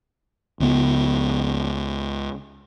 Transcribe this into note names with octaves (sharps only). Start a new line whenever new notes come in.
C#2 C#3 B3